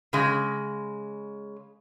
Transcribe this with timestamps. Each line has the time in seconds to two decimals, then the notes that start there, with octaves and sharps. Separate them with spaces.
0.13 C#3 G#3